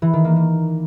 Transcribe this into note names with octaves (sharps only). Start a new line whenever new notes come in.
E3
D#3
A#3
A#3